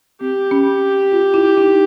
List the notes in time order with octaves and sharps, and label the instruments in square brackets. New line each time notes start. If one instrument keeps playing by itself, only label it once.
[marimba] C4 [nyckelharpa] G4
[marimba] C#4
F4
E4
D#4